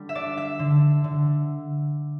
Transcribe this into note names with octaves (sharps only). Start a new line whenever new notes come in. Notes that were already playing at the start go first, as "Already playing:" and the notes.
Already playing: D3 G3
E5
D4 D5
E5
D3
D3